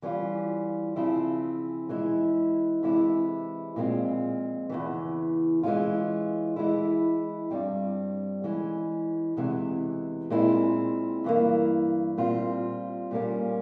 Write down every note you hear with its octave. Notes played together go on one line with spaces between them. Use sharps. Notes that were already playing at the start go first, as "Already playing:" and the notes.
E3 G3 C#4 F4
C#3 F3 C4 E4
E3 G#3 C#4 E4
C3 E3 G#3 E4
A#2 F3 G#3 C4
E2 C#3 E3
E3 G#3 C#4 F4
E3 G#3 E4
G2 G3 C4
E3 G#3 C#4
E2 C3 E3 G#3
A#2 G#3 C4 E4
G2 E3 A#3
A#2 G3 C4 F4
A#2 G3 A#3 C#4